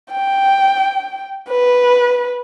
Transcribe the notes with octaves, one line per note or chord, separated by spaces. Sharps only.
G5
B4